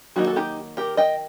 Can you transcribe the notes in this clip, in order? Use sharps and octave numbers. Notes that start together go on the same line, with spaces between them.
D#3 F#3 A#3 D#4 F#4
A4
D#4 G4
G4 A#4
D#5 G5